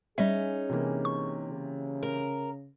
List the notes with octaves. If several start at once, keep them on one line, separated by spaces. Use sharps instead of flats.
G3 C#4 D#4 G#4 E5
C3 E3 A#3
C#6
C#3
A#4